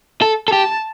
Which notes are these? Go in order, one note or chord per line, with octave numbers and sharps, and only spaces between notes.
A4
A4
G4 A5